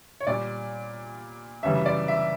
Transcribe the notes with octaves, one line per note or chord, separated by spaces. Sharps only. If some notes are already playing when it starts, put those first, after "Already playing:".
C#5
A#2 G3 D5
F#2 C#3 E3 G3 E5
D5
E5